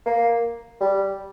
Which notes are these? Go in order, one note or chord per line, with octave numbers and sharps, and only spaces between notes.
A#3
G3